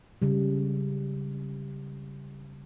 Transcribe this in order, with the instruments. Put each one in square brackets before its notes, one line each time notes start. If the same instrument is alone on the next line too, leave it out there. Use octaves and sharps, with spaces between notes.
[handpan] C#3 G3